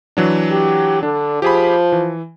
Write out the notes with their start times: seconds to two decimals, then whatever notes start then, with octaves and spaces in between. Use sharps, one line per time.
0.17 E3 F#3 D4
0.51 G4
1.03 D3 D4
1.42 F3 G4 G#4 B5
1.92 E3